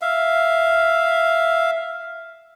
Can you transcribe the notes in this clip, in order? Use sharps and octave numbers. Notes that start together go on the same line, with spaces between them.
E5 F5